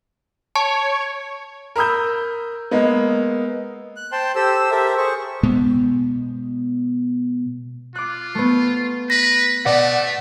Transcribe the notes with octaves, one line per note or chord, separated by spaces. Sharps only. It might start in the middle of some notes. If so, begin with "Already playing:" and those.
C#5 A5
A#4 A#5 B5 D#6 E6 G6
G#3 A#3 B3
F#6
C5 G5 A5 C6
G4 A4 C5 E6
G4 A4 A#4 C5 E5
G#4 C5 C#6
B2 G#3 B3
F4 D6 F#6
A3 B3
B4 A#6
B2 A3 D5 F#5